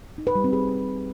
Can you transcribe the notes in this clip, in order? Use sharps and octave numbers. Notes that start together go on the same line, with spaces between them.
D#4
B4
G3
C4
G#4